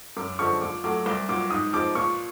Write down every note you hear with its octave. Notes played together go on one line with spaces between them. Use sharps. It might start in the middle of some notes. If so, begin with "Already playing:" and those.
F#2 D6
D3 F3 G#3 C#6
A#2 D6
F#3 A3 D6
C2 D6
A#2 F#3 D6
G#2 D#6
F3 G#3 D6
A#2 C#6